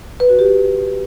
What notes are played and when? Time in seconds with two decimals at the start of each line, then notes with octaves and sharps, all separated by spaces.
0.20 B4
0.29 F#4
0.39 G4